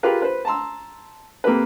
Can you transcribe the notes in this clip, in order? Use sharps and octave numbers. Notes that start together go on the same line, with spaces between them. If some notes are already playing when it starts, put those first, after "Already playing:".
F4 G4 G#4 A#4 B4 F5
B4 C5
A5 A#5 C6 E6
C3 A#3 G4 A4 B4